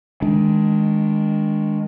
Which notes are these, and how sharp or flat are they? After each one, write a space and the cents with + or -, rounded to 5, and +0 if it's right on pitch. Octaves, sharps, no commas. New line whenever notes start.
D#3 +20 G#3 +0 D4 -5